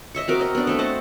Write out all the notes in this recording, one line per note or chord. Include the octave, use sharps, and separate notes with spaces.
D#5 E5 C#6
C4 F#4 A#4 D6
C4 D#5
B3 D4
A3 C4
C5 D#5 F#5 A5